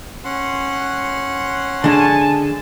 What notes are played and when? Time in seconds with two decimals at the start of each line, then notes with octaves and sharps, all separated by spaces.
0.25 C#4 F#5 C6
1.84 D3 G#3 G#5 A5